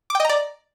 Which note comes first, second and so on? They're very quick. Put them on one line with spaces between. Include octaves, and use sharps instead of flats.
D6 G5 D#5 A#5 D5